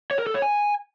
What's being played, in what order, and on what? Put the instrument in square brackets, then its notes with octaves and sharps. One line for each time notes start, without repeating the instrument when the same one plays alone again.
[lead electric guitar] C#5
A#4
A4
C#5
G#5